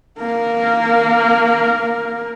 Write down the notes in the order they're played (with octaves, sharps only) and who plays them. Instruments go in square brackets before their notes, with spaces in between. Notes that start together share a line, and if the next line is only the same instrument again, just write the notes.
[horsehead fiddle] A#3 A#4